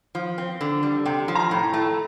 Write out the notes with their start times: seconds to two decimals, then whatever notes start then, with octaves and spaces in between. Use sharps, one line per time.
0.15 F3
0.38 C4
0.61 D3
0.83 G3
1.06 C3 G5
1.28 F3
1.35 A#5
1.51 A2
1.73 A3